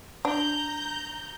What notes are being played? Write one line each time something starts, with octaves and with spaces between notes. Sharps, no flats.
D4 A#5 G6